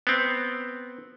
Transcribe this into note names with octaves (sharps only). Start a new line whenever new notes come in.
B3 C4